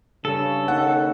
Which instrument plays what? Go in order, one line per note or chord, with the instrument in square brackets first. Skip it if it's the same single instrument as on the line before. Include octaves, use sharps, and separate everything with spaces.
[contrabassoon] G2 [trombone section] C#3 [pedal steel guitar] A4
[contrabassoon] D#2 [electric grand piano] F#5